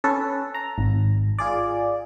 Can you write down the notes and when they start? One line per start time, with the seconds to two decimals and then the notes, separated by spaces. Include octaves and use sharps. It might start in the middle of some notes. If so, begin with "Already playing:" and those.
0.04 C#4 A4 B4
0.54 A#5
0.78 G#1
1.39 F4 G#4 D5